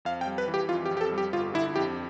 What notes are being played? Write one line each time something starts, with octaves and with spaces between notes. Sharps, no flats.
F2 F5
G5
G3
B4
E3
G4
F2 F4
G4
F2
G4
A4
G3
G4
G1 F4
D3 E4
F2 G4